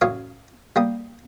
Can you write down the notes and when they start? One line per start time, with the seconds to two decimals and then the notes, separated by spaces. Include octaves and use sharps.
0.01 A1 F#2 C#5 F5 D#6
0.76 G3 A#3 D#6